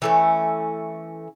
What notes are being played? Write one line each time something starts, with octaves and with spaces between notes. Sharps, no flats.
E3 A3 C#4